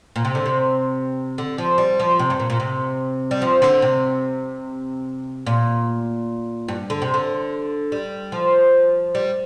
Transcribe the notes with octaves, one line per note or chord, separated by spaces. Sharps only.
A#2
C3
D3
C3
D3
F3
G3
F3
C3
G2
A#2
A#2
C3
G3
F3
D3
C3
A#2
G2
D3
C3
D3
G3
F3
G3